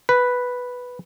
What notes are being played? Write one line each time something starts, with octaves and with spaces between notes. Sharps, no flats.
B4